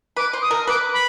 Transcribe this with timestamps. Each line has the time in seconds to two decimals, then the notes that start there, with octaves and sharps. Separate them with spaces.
0.16 B4 D6
0.33 C5
0.42 D#6
0.51 A#4
0.67 B4 D6
0.93 B5